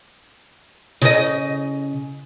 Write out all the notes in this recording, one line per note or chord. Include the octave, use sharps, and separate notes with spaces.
C#3 D#5